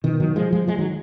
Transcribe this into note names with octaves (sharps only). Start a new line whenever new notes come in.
B2 D#3
D#3 F#3
F3 G#3
F3 G#3
F3 G#3
D#3 F#3